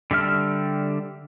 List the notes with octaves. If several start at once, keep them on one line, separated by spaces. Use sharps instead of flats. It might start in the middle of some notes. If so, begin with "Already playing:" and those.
D3 G3 E5 F6